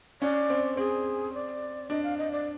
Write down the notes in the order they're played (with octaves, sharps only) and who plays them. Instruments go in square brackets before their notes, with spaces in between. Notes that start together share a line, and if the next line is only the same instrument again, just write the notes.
[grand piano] C#4 [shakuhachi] D5
[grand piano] C4
[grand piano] C4 [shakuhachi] G#4
[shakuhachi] D5
[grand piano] D4 [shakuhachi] D#5
[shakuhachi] F5
D#5
D5